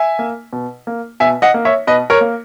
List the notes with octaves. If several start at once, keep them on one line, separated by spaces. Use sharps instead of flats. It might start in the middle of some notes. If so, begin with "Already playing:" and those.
Already playing: E5 G#5
A#3
B2
A#3
B2 E5 G#5
D#5 F#5
A#3
C#5 E5
B2 B4 D#5
A#4 C#5
A#3